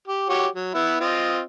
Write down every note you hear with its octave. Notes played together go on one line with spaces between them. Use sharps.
G4
F#4 G4 C#5
F#3
B3 E4
C4 F4 D#5